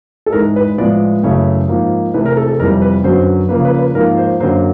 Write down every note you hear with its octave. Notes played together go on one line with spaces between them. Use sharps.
A4
G#2 E3 G#3 A#4
B4
A2 F3 G#3 B3 D5
F#2 C#3 E3 A3 C#5
G#2 F3 A#3
C3 E3 A3 B4
A#4
A4
A4
F2 C3 E3 G3 A#4
B4
F#2 D3 F#3 B3 C5
C#3 F3 A#3 B4
B4
B4
G#2 F3 A#3 A#4
C5
F#2 D3 F#3 A#3 C5